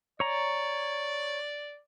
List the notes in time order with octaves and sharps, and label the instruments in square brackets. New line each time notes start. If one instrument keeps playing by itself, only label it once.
[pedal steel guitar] C#5 A#5 [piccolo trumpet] D5